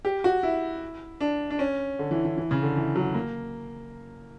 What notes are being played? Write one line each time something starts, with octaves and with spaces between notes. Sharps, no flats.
G4
F#4
E4
D4
D4
C#4
D3
E3
E3
E3
C#3
D3
E3
F#3
A#3